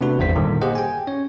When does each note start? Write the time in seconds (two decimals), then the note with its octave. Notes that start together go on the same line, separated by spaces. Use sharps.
0.01 C3 A3 B3 D4 F#4 B4
0.18 G#1 E2 G2 B3 C5 B6
0.35 G2 A#2 D3 D#3
0.61 A#3 G4 G#4 C5 D#5 F#5
0.75 G5 G#5
1.07 C#4 C#5